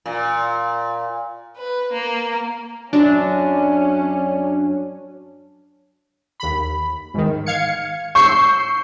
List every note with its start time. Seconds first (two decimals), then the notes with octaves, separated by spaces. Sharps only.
0.06 A#2
1.57 B4
1.92 A#3
2.93 F#2 F#3 C#4 D4
6.40 D#2 B5
7.14 G#2 D#3
7.46 F5 G#6 C#7
8.15 C#6 E6 G6 C7